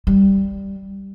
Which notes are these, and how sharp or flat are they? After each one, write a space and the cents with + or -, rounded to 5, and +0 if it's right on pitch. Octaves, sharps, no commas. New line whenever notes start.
G3 +0